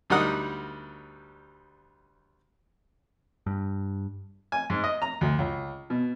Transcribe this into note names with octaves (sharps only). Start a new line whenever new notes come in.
D2 G3 D#4 A#4 F#5 D#6
G2
G#5
G#2
D#5
A#5
D2
C#2
B2